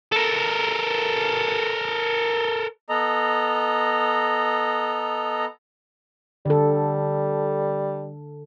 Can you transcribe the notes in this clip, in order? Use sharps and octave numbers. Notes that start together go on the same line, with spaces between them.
A4 A#4
B3 A4 D#5 A#5
D3 G3 A4